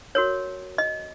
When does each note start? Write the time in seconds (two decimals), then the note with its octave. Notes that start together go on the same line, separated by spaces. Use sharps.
0.15 F#4 A#4 C#5
0.78 D#5